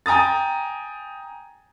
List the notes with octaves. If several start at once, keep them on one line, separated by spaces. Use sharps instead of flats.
G5 G#5 A#5 D#6 A6